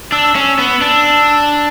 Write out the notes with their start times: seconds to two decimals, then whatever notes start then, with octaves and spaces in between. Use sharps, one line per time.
0.12 D4 E6
0.35 C#4
0.59 B3
0.81 D4